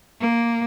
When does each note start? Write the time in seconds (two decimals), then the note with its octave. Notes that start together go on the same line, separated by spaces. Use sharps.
0.20 A#3